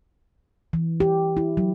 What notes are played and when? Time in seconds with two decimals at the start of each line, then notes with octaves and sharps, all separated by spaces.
0.73 E3
1.00 G4
1.37 E4
1.57 F#3